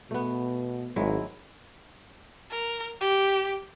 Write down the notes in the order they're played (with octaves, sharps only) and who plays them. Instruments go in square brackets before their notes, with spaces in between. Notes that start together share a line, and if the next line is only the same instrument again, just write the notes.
[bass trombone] B2 [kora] A3 B3
[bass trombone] G#1 [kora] F#3 G#3 E4
[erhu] A#4
G4